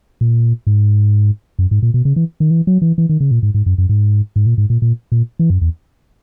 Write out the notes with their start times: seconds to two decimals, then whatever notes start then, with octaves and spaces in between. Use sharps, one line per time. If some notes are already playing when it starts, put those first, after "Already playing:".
0.21 A#2
0.67 G#2
1.59 F#2
1.71 G#2
1.83 A#2
1.94 B2
2.05 C#3
2.16 E3
2.40 D#3
2.51 E3
2.67 F#3
2.82 E3
2.98 E3
3.09 D#3
3.20 C#3
3.31 A#2
3.43 G#2
3.54 G#2
3.66 F#2
3.78 F#2
3.89 G#2
4.36 G#2
4.46 A#2
4.58 G#2
4.70 A#2
4.82 A#2
5.12 A#2
5.39 E3
5.50 F#2
5.61 E2